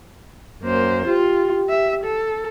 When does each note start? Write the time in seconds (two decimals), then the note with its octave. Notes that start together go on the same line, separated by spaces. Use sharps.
0.63 F#2 A#3 C5
1.06 F4 G4
1.69 E5
2.04 A4